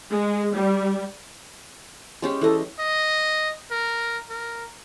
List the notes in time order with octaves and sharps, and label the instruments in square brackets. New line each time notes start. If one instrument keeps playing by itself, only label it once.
[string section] G#3
G3
[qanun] G#3 C#4 G4
[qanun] E3 D#5 [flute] A4
[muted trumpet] D#5
A#4
A#4